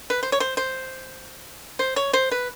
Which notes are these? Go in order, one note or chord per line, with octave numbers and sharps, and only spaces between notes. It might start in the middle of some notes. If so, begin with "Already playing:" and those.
B4
C5
C#5
C5
C5
C5
C#5
C5
B4